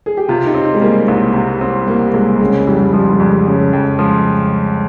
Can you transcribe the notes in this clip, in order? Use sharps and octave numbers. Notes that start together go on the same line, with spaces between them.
G#4
G4
C3 F4
D#4
C4
D#4
G#3
G3 A#3
C2
C3
C4
G3 A#3
C2 G#3
C#3 G#3
F2 G3
G#3
F3 G3
G3
F2
G#3
C#3
F2
F3 G#3